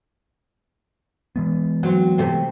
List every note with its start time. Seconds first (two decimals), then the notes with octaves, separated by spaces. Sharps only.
1.36 E3 G#3 B3
1.83 F#3 C4
2.18 C3 A3 C4